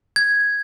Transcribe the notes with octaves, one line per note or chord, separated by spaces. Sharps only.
G#6